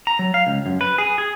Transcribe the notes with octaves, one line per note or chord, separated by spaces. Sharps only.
A#5
F#3
F5
C#2
F#2
B4
G#4
G#4